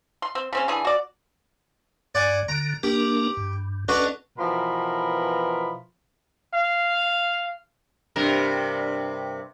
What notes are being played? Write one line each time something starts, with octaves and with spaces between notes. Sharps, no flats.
C6
C4
C#3 C4 C#4
D3 E3 G#4
F#4 D5
G2 D5 F#5 G#5
D3 A#5
A#3 D4 G4 A#4
G2
C#4 D4 F#4 A4 B4 D#5
B2 E3 F3 B3 A#4 B5
F5
G2 C3 A#4